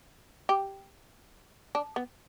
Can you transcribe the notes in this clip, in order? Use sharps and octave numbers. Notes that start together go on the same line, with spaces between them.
G4
D4
B3